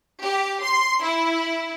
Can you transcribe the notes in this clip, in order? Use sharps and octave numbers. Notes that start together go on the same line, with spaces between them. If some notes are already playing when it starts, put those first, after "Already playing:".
G4
C6
E4